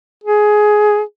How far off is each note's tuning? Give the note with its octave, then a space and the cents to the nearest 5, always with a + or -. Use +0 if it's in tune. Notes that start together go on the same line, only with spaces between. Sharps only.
G#4 +15